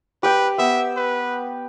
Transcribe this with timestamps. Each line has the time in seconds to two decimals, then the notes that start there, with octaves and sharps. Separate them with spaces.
0.23 G4 B4 G5
0.58 B3 E5
0.97 B4